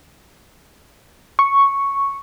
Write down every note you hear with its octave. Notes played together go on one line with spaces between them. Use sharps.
C#6